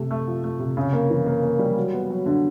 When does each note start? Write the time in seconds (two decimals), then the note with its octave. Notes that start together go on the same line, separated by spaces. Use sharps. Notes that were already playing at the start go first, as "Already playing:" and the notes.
Already playing: C3 A3
0.11 A3
0.27 F3
0.44 A3
0.59 C3
0.77 C#3
0.93 A#3
1.10 E3
1.26 A#3
1.43 A#3
1.59 G3
1.77 F#3
1.93 B3
2.10 F#3
2.26 D3